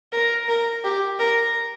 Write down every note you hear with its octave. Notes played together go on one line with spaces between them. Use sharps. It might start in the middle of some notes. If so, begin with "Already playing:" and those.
A#4
A#4
G4
A#4